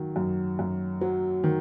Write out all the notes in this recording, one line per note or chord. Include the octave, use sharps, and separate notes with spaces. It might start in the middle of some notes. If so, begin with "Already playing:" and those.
Already playing: D#3 F#3
F#2
F#2
F#3
D#3